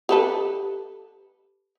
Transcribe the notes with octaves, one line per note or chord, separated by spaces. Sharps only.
G4 A4 B4